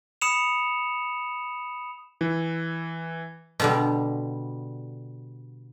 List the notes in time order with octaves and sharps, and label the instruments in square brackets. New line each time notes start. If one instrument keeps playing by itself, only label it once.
[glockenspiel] B5 D#6 C#7 E7 F7
[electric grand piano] E3
[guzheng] B2 D3 G3